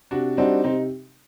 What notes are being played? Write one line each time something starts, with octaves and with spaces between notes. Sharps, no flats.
C3 D4 F#4
G3 C4 D4 D#4 F#4
C3 C4 D#4